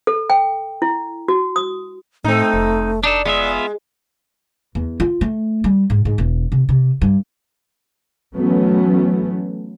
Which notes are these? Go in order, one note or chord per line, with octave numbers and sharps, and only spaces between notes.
A4
G5
E4
F#4
D#6
A2 A3 C4 D#4
F1
D4 D#4 A4 D5
G#3 B3 F4 E5
E2
F4
A3
G3
G#2
G#2
E1
C3
C3
G2
E3 F#3 A3 B3 C#4